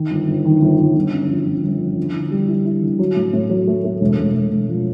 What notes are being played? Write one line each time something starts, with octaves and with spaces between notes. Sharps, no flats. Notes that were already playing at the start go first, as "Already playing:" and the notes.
Already playing: D#3
G1
G1
D#3
G1
G1
G1
F#2
F3
G1
G1
F3
D3
E4
G3
E4
E4
D3
F#3
A2
A2
F#3
A3
A3
E1
E1
E1
E1
F3